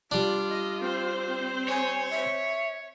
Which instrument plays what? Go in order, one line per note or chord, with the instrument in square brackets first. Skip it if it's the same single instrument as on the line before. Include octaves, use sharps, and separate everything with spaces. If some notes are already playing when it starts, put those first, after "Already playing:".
[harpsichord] G3 D4 [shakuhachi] F4
[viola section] D#5
C4 C5
[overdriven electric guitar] C#5 [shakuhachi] G#5
[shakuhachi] E5